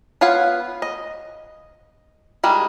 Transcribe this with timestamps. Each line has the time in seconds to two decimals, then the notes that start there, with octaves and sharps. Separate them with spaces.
0.21 B3 F4 C#5 F5 F#5
0.82 D#5
2.44 D#3 G3 G#3